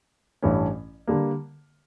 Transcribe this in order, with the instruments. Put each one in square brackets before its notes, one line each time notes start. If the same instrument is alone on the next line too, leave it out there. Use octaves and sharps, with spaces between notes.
[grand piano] A1 G2 E3 A3 C#4
D3 G3 A#3